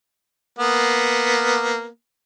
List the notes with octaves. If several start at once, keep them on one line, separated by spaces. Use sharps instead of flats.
A#3 B3